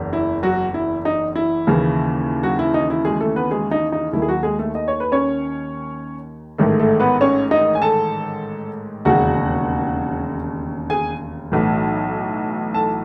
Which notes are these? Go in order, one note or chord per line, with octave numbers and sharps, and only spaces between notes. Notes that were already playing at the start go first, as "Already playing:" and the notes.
Already playing: F#1 E2
E4
F#3 F#4
E4
D#4
E4
D#2 C#3 E3
F#3 F#4
E4
D#4
E4
G#3 G#4
A3 A4
B3 B4
G#3 G#4
D#4
D#4
D#2 D#3 E4
G#4
F#3 F#4
G#3 G#4
A3 A4
D#5
C#5
B4
C#4 C#5
A1 G#2 D#3 A3 A4
A3 A4
B3 B4
C#4 C#5
D#4 D#5
G#5
A4 A5
E1 D#2 C#3 F#4 F#5
G#4 G#5
B1 A2 E3
A4 A5